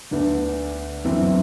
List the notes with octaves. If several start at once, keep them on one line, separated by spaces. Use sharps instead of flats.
D2 D3 B3 D4
G1 F#2 E3 C4 E4